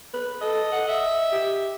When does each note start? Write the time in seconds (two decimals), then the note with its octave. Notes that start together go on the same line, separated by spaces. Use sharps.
0.14 B4
0.41 A4 D#5
0.72 F#5
0.88 E5
1.32 G4